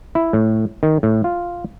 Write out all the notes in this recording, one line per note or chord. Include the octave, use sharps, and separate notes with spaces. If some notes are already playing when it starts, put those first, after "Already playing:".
E4
A2
D#3
A2
F4